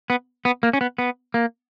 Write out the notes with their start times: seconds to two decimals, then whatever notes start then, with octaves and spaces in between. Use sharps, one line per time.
0.10 B3
0.45 B3
0.63 A#3
0.73 C#4
0.81 B3
0.98 B3
1.34 A#3